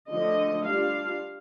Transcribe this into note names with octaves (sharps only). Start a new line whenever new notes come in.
D3 F3 A3 D4 D#5
G3 D4 F4 F5